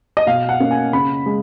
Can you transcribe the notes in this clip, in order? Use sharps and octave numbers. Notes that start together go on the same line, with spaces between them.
D#5
B2 F5
F#5
A#3 C#4
G#5
C#3 B5
G#3